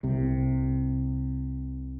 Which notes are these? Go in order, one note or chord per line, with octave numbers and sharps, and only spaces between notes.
C2 C3